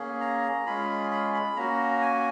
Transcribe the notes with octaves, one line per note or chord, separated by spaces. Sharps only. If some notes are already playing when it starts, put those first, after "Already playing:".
Already playing: A#3 C#4 G#4
A#5
G#3 C#4 F4 G#4 B5
B5
B5
A#3 C#4 F#4 A#5
G#5